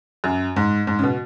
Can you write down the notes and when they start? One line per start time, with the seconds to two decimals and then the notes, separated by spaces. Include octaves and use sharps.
0.24 F#2
0.56 G#2
0.87 G#2
0.99 C#3
1.03 B2